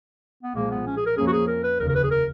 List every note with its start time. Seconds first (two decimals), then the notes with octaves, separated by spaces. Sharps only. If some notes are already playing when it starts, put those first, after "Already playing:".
0.43 B3
0.55 B1 A#2 F3 G#3 A#3
0.71 B3
0.87 C#4
0.97 G#4
1.06 A#4
1.17 F2 F3 A#3 C#4 G#4
1.27 F#4
1.32 G#4
1.48 A#4
1.63 B4
1.79 F1 D#2 C#3 A#4
1.89 A#4
1.95 B4
2.04 G#4
2.11 A#4